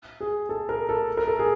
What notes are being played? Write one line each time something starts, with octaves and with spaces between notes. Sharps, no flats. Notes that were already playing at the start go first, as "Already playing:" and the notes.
G#4
A4
A#4
A4
A#4
A4
G#4